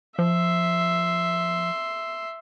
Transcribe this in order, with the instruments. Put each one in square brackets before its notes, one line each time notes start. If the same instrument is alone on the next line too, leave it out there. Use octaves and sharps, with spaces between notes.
[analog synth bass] F3 [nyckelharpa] E5 C6